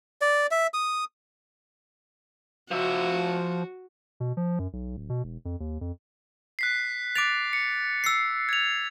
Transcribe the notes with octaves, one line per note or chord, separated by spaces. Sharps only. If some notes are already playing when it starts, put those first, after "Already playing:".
D5
E5
D#6
F3 F#4 E5
B2
F3
F#2
B1
D1
B2
E1
F2
D#2
F2
F#6 B6 C7
D6 A6 D7 F7
C#7
E6 C7
G#6 F7